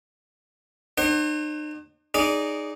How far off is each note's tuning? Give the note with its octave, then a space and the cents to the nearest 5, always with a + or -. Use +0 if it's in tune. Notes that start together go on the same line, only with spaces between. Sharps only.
D#4 -45 C5 +40 F#5 +35
D#4 -15 G#4 +0 D5 -25